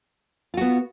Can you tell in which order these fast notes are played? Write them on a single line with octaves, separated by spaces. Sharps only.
F4 F#4 B3